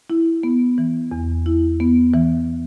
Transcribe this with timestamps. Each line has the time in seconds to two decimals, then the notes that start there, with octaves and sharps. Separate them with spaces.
0.10 E4
0.43 B3
0.78 E3
1.12 E2
1.46 E4
1.80 B3
2.14 E3